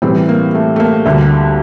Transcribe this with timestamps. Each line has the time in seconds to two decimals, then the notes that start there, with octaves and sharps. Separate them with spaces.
0.02 A2 E3 G3 C4
0.29 A#3
0.55 A3
0.76 A3
0.80 A#3
1.06 D2 D3 G3